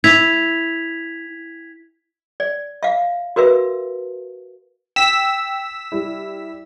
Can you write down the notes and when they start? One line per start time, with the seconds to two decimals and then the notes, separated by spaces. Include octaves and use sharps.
0.04 E4 G#6 B6 F7
2.40 D5
2.83 E5 F5
3.36 F#4 A#4 B4 E5
4.96 G5 E6 B6
5.92 G3 E4